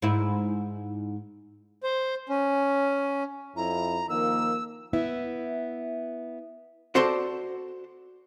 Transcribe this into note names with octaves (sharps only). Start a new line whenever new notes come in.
G#2 E4
C5
C#4
F2 E4 A#5
D#3 F3 A#3 E6
B3 E4 E5
F#4 A4 C5 D5 A5 C6